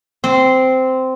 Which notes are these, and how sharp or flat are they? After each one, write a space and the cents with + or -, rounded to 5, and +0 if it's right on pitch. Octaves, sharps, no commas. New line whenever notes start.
C4 -10